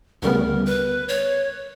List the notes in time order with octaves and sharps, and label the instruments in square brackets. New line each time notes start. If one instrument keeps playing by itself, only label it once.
[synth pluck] D2 C#3 G3 B3 [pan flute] A#4
[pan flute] B4
C#5